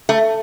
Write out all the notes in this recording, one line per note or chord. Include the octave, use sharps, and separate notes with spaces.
A3